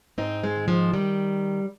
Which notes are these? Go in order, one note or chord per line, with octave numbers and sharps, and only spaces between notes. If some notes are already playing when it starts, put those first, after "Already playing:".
G#2 C4 D#4
G#3 C4
D#3
F3 G#3
D#3 G3